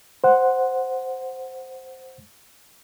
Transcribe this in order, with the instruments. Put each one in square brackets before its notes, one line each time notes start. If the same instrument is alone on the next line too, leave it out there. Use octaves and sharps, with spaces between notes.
[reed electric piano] C5 F#5